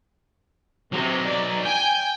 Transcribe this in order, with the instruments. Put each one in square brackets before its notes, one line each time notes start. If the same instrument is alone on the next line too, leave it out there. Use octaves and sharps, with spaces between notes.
[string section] C3 [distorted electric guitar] F#3 D#4
[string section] D5
[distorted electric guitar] G5 [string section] G#5 G6